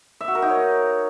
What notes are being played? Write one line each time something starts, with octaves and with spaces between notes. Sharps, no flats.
E5
F#4
A#4
D#4
C#5